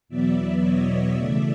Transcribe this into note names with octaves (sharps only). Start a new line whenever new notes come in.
E2 B2 F#3 B3 D5 E5
C#5 D#5
C#3 E3 A3 D5 E5